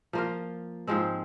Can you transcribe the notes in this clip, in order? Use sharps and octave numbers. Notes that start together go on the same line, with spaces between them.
F3 A#3 F4 A#4
G#2 F3 G#3 C4